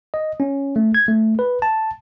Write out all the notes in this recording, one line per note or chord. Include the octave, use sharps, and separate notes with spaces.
D#5
C#4
A3
G#6
A3
B4
A5